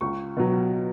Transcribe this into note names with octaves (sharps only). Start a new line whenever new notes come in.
C#2 C#6
B2 F#3